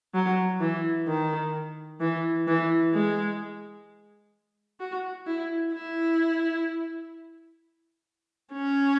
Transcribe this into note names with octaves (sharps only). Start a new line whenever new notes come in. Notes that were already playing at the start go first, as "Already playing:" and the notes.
F#3
E3
D#3
E3
E3
G#3
F#4
E4
E4
C#4